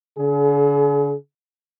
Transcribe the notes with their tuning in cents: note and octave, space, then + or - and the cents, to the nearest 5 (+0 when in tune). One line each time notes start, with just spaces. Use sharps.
D3 -40 G#4 +40